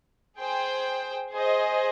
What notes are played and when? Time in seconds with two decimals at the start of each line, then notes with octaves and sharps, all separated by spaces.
0.39 G#4 C5 G5
1.31 G#4 C5 D#5